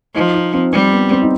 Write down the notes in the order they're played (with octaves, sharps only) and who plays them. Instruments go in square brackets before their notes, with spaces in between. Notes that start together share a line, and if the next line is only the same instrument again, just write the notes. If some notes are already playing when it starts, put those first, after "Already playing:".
[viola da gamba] F3 [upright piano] D#4
[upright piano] D#4
C4
[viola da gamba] G3 [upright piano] C4
[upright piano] B3
C4
D#4